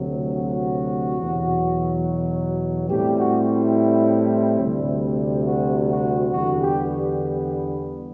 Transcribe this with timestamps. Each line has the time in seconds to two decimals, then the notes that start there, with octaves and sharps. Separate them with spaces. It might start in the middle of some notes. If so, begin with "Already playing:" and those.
Already playing: D2 C3 F#3
0.33 F#4
1.19 E2 B2 F#3
2.89 A2 G3 C4 G4
3.18 F#4
3.47 E4
4.61 D2 C3 G3
5.46 F#4
5.89 F#4
6.32 E2 D3 G3 B3 F#4
6.61 G4